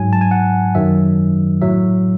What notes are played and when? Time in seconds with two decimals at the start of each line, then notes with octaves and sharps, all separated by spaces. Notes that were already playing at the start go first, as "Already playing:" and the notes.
Already playing: G#2 F#3 G#5
0.13 A5
0.21 G#5
0.31 F#5
0.75 F#2 D#3 F#3 E5
1.62 A2 F#3 E5